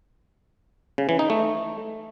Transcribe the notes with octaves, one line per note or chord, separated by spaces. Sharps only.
C#3
E3
D#4
A3